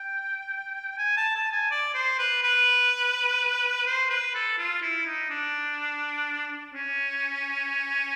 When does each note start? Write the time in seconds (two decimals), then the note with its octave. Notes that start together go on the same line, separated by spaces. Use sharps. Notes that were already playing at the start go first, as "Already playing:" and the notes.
Already playing: G5
0.98 G#5
1.17 A5
1.35 A5
1.52 G#5
1.71 D5
1.94 C5
2.19 B4
2.43 B4
3.86 C5
4.10 B4
4.35 A4
4.58 F4
4.82 E4
5.06 D#4
5.30 D4
6.74 C#4